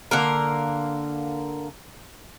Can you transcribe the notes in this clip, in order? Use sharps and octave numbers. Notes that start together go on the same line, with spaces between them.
D3 A#3 A#4